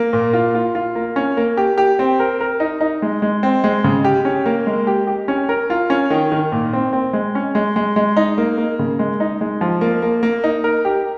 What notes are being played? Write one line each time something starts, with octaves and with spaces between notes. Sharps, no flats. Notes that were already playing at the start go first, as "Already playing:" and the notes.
Already playing: A#3
A#2
F4
F4
F4
A#3
C#4
A#3
G4
G4
C4
A#4
A#4
D#4
D#4
G#3
G#3
C4
G#3
C#3
G4
C#4
A#3
G#3
G4
G4
C#4
A#4
F4
C#4
D#3
D#3
A#2
C4
C4
G#3
C#4
G#3
G#3
G#3
D#4
A#3
A#3
C#3
G#3
D#4
G#3
F3
A#3
A#3
A#3
D#4
A#4
G4